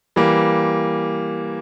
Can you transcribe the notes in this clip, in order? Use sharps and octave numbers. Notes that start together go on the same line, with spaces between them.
E3 G3 A#3